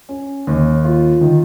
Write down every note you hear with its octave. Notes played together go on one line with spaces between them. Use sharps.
C#4
D#2
F4
D#3